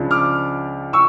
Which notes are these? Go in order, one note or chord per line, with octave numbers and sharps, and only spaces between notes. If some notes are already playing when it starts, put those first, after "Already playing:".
Already playing: C#2 C#3 F3 D4
D6 F6
C#6 E6